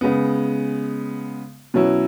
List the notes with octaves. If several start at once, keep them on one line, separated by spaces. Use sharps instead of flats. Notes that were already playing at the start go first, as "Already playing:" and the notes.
C#3 G#3 B3
B2 F#3 C#4 E4